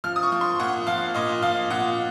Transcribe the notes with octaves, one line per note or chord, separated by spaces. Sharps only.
F3 F6
D#6
C#6
F3
C6
A#2 F#5
F3 F5
A#2 D#5
F3 F5
A#2 F#5